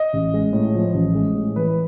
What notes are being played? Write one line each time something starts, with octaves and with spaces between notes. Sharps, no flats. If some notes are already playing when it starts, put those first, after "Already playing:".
Already playing: D#5
A1
G#3
A2
F3
A1
G#3
A2
E3 B4